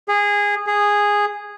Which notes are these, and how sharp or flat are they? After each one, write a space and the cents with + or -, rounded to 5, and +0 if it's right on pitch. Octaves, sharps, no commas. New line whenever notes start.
G#4 -20
G#4 -10